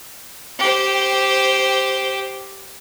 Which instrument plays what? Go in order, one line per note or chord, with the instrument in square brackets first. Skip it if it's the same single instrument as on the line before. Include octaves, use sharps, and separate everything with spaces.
[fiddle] G4 C5